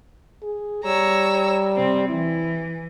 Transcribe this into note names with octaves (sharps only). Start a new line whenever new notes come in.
G#4
G3 C#5 A#5 E6
C3 C4
E3 E4